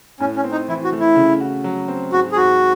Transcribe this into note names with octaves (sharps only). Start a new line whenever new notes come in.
A2 C#4
C#4
C4
D#4
E3 E4
F#4
A3
E4
C#3
F#4
F#3
C4
G#2 F#4
G#4
G#2 F#4